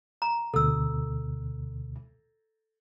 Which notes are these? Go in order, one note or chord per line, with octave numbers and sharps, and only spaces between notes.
A#5
D2 B2 A4 E6